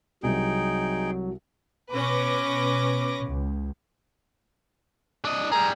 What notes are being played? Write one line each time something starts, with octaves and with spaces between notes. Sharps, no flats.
C2 C3 F#3 D#4 G#4 G5
B2 C#4 B4 D6 A#6
C#2
D4 D#5
G3 G#4 A#5